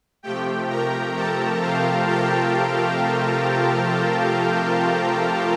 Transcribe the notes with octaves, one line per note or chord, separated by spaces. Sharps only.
C3 F3 A3 G4 G5
A#4 A#5
A4 A5
F4 F5
G4 G5